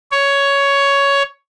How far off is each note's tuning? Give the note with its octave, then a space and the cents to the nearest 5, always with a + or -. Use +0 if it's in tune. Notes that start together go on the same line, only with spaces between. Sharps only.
C#5 +10